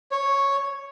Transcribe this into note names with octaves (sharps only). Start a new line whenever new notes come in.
C#5